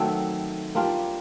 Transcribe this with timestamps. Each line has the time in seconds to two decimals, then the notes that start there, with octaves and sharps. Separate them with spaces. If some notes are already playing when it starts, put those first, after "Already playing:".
Already playing: D#3 F#3 A3 C4
0.75 G3 A#3 D4 F4